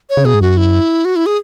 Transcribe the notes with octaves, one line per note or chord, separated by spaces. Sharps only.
C#5
C#3
B2 G#4
G#2
F#2 F#4
E4
F#4
E4
G#4